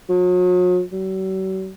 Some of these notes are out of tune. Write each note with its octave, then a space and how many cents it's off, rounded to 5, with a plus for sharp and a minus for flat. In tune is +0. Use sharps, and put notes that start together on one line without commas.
F#3 -40
F#3 +45